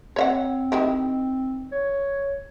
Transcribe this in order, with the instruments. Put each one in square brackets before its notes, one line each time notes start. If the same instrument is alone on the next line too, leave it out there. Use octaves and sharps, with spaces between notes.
[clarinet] C4 [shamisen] C#5 E5 F#5
[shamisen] D#3 E4 G4
[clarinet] C#5